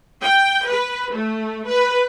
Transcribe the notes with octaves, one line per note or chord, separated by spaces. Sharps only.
G5
B4
A3
B4